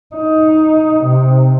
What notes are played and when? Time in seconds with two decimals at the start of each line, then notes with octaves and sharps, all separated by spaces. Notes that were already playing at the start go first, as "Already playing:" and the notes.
0.16 D#4
1.05 C3